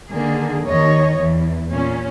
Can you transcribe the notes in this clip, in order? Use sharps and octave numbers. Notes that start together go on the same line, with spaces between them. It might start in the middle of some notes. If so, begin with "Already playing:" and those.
D3 D#3 A#3 G#4
D#2 D#3 C#5 D#5
E2 E3
A#2 C#4